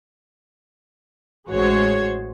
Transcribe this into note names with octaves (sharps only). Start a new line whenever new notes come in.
A1 G#3 F#4 C5 C#5 G#6